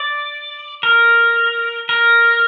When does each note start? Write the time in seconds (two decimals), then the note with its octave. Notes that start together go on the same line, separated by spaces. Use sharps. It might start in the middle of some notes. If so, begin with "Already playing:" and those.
Already playing: D5
0.83 A#4
1.89 A#4